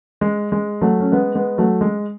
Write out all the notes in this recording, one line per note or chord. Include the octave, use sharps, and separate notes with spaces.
G#3
G#3
F#3 A3
C#4
G#3 B3
G#3 B3
F#3 A3
G#3